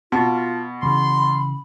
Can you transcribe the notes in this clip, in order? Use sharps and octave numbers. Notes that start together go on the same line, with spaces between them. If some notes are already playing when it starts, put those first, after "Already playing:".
B2 F4 A5
C#3 E3 B5 C6